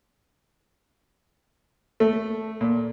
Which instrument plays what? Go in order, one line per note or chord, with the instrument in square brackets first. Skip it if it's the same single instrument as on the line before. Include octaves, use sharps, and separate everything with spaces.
[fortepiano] A3
A#2